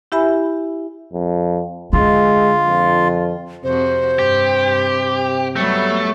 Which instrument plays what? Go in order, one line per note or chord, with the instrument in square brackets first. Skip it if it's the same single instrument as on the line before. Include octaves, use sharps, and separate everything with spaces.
[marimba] E4 G4 E5 G#5 B5
[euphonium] F2
[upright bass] D3 [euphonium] G#3 [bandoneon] F4
[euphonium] F2
[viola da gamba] F2 F3 F#4 [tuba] C3 [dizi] C5
[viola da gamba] G2 [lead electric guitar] G4
[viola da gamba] F#3 G3 B3 [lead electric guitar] A3